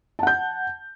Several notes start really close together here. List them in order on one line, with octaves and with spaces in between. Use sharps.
A5 F#5 G6